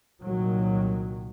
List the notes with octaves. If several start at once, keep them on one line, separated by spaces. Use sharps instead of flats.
C2 A#2 D#3 F#3